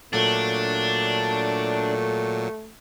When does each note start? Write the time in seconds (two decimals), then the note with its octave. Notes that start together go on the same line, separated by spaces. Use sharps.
0.13 A#2 F#3 A3 D4